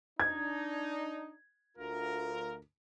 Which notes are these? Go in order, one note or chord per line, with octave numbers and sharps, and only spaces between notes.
D4 D#4 G#6
D2 F4 A#4